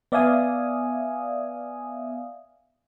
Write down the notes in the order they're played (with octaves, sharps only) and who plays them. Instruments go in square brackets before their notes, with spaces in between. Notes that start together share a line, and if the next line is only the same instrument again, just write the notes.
[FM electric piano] B3 D5 E5 F5 G#5 D#6